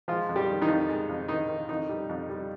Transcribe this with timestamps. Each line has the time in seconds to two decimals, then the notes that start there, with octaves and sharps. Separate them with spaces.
0.08 F3 G#3 F4
0.29 F2
0.36 G3 G4
0.49 D#3
0.62 D#3 D#4
0.68 F2
0.89 G#3
1.09 F2
1.28 D#3 D#4
1.48 D#3
1.69 F2 D#3 D#4
1.89 G3
2.09 F2
2.30 G3